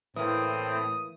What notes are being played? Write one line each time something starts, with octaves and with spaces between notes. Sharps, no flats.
A2 E3 A#3 C4 D#6